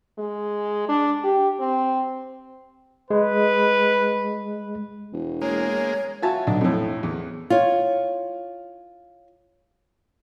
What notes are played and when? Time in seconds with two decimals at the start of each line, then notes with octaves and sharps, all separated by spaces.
0.18 G#3
0.89 D4
1.24 G4
1.60 C4
3.11 G#3 B4
5.13 E1
5.42 G#3 A#3 C#5
6.22 F4 F#4 C#5 E5 G#5 A5
6.47 B1 D4
6.61 F2 A2
7.03 E2
7.50 F4 C#5